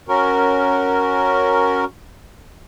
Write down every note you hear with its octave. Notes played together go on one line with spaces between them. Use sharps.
C#4 F#4 A#4